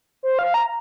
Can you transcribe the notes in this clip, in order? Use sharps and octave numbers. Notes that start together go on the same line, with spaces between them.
C5
F5
A#5